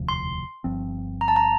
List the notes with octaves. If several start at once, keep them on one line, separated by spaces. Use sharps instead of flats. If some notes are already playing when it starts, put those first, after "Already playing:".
Already playing: E1 D2 C3 F3
C6
G1 G2 F3 C4
A#5
A5
A#5